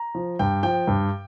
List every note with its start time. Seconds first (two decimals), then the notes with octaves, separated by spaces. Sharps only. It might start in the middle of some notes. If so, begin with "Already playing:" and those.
Already playing: A#5
0.15 F3
0.39 G2 G5
0.63 F3 G5
0.87 G2